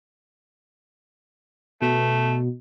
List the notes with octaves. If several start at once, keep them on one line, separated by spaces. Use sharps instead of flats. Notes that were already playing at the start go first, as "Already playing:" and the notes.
B2 A3